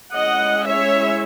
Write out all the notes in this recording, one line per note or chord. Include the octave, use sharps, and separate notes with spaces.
G#3 C#4 E4 D#5 F#5
C#5 E5